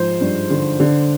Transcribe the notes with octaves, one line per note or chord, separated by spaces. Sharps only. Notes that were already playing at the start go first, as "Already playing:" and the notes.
Already playing: G#2 F3 C5
G2
D3
D3